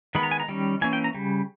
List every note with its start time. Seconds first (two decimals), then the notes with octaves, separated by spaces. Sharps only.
0.15 D#3 G#3 B3 B5
0.23 A#5
0.31 G#5
0.40 A#5
0.48 D#3 G3 C#4
0.81 E3 A#3 C#4 G#5
0.93 G5
1.04 A#5
1.14 C#3 G3